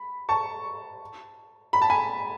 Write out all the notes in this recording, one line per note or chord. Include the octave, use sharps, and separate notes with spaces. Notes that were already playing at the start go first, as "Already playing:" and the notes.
Already playing: B5
A5 C#6
B5
A5
G#5 B5